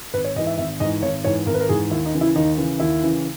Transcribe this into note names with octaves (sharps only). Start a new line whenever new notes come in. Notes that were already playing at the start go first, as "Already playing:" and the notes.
G#1 B4
C#5
G#2 E3 D#5
E5
G#1 E5
G#2 E3 D#5
G#1 C#5
G#2 E3 C#5
G#1 A#4
B4
A#4
G#2 E3 G#4
D#2 E4
D#4
C#3 E3
E4
D#2 D#4
C#3 E3
D#2 E4
C#3 E3